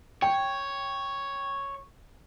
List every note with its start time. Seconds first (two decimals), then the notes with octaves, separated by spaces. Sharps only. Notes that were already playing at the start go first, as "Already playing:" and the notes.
0.22 C#5 G5